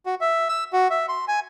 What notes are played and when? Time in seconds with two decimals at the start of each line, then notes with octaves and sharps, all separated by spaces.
0.06 F#4
0.21 E5
0.49 E6
0.73 F#4
0.90 E5
1.09 C6
1.28 G#5